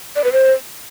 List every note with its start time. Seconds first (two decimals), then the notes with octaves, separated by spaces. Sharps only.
0.16 D5
0.24 B4
0.32 C5